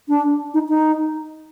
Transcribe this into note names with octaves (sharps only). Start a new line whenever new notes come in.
D4
D#4
D#4